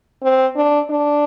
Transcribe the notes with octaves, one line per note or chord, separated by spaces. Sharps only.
C4
D4
D4